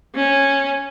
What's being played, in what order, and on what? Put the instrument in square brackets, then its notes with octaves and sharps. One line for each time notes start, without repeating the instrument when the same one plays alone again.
[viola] C#4